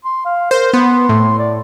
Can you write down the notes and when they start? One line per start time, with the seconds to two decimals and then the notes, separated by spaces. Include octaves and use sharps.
0.04 C6
0.25 F5
0.51 A#4 C5
0.73 B3 C6
1.09 A2
1.39 D5